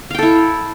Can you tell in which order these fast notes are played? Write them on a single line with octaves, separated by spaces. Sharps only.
F5 G5 A4 E4